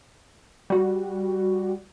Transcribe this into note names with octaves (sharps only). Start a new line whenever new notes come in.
G3 F#4